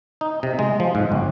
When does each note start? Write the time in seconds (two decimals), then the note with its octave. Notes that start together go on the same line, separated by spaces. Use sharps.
0.21 D#4
0.43 C3
0.59 G#3
0.80 F3
0.95 G#2
1.12 G1